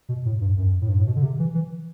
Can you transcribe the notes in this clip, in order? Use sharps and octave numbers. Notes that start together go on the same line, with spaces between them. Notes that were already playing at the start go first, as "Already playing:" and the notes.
B2
A2
G2
F#2
A2
G2
A2
B2
D3
C3
E3
E3